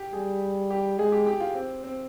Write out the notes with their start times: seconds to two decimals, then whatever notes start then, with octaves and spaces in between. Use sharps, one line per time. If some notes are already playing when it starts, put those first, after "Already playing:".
Already playing: G4
0.13 G3 G#4
0.70 G4
0.98 G#3 G#4
1.12 G4
1.26 G4
1.40 F4
1.54 C4
1.83 C4